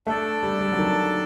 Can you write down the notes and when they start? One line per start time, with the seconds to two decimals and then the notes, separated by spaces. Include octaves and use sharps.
0.07 A3 D4 A4 D5
0.43 G3
0.61 G3
0.72 F#3
0.78 D#3